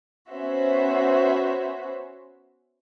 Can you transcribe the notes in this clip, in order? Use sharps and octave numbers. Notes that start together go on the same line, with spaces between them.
B3 C#4 F#4 C5 C#5 E5